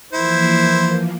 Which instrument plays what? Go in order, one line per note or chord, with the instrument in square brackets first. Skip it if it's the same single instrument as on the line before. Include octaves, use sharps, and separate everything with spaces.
[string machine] E3 F3 A#3 [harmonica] E4 C5